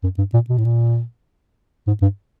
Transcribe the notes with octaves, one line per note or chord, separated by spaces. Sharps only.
F#2
G2
A#2
B2
A2
A#2
G#2
G2